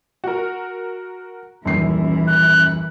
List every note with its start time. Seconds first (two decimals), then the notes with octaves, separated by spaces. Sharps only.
0.24 F#4 A#4
1.65 D#1 F#2 E3 C7
2.27 F#6